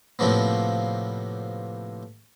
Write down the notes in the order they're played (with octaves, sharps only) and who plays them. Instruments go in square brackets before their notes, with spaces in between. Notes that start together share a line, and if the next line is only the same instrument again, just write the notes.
[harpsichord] A2 C3 F3 A#3 B3